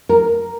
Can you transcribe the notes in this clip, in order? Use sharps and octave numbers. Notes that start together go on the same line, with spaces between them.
A#4